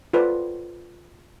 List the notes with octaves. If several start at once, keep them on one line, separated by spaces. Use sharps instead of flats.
F4 A4 B4 C5 D5